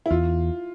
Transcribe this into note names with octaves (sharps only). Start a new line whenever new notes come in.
E4
E2 F4